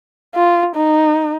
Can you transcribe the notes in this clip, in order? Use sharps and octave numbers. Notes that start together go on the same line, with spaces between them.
F4
D#4